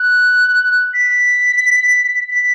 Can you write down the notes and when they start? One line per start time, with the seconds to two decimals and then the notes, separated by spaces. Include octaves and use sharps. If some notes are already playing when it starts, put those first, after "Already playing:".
Already playing: F#6
0.93 B6
2.30 B6